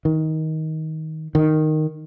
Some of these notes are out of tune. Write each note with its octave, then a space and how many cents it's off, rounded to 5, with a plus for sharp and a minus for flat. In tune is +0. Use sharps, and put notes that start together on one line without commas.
D#3 +20
D#3 -5